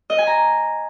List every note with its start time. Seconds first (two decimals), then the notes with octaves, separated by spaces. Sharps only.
0.10 D#5
0.18 G#5
0.27 A#5